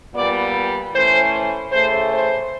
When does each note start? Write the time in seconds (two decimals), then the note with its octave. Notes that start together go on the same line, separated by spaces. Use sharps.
0.14 A#2 G3 B3 D5
0.93 E3 A3 C#4 C5
1.72 C#3 E3 A3 C5
2.11 C5